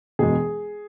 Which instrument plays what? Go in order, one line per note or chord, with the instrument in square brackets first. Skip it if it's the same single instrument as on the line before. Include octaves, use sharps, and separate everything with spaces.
[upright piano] E1 B2 G#3 G#4